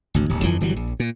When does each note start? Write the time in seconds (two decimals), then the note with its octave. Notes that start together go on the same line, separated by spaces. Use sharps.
0.14 G#1 D2
0.30 D1 D#2
0.43 G1 F2 E3 F3
0.61 G1 E3 F#3 G3
0.76 A#1
1.00 A#2